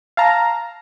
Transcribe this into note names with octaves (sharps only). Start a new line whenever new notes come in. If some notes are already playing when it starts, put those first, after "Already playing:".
F5 A5 A#5